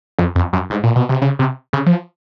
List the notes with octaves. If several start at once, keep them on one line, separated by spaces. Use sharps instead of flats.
F2
F2
F#2
G#2
A#2
B2
C3
C#3
C3
C#3
F3